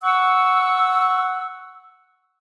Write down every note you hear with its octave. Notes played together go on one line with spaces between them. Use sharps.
F#5 C#6 E6